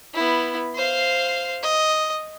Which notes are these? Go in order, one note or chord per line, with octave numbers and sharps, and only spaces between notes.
B3 E4
C5 F5
D#5